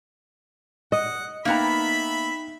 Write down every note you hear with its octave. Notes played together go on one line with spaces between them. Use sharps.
D#5 F#5
A#3 B3 D#4 E5 G5 A#5 B5